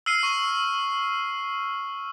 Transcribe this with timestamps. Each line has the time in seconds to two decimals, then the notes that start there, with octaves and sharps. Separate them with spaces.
0.06 E6 F6 C7 D#7
0.23 C#6